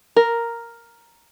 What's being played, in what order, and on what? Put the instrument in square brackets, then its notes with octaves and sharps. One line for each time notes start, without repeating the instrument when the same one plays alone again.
[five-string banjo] A#4